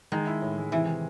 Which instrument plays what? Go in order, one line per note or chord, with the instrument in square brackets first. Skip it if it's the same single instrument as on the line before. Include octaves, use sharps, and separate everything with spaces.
[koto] D#3 [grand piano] G#3
[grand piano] E4
A2
G#3
[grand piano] C3 [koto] E3
[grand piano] D#3